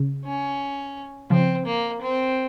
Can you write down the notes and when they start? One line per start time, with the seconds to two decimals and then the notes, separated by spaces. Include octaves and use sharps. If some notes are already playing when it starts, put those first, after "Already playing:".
Already playing: C#3
0.25 C#4
1.30 C#3 F3 C4
1.66 A#3
2.01 C4